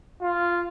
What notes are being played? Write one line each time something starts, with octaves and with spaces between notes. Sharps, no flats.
F4